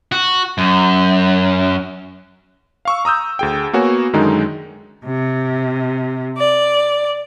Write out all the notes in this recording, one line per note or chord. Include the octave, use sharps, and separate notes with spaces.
F#4
F#2
F5 C#6 E6
A#5 D#6 E6 G6
D2 G#4 G5
A#3 B3 F#4 C#5 G#5
F#2 D3 D#3 G#3 D#4
C3
D5